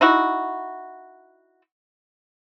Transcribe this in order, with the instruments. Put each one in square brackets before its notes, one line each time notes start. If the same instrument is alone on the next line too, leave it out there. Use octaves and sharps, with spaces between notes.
[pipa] D#4 E4 F#4